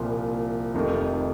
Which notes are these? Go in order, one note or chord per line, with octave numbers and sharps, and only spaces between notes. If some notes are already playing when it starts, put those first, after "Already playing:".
Already playing: C2 A#2 F3
F1 F2 C3 D#3